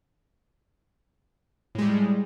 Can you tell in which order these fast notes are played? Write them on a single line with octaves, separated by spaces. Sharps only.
A2 G#3 G3